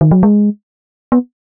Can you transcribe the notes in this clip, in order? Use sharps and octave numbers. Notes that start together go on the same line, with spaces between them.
D#3
F#3
G#3
B3